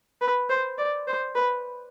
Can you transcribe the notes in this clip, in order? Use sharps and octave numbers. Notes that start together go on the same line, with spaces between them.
B4
C5
D5
C5
B4